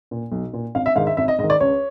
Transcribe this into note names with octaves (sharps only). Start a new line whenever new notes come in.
A#2
B1
A#2
G#1 F5
E5
G#2 D#3 F5
E5
G#1 E5
D#5
G#2 D#3 D#5
D5
C#2 C#5